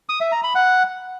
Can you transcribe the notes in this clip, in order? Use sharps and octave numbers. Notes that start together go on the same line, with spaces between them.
D#6
E5
A#5
B5
F#5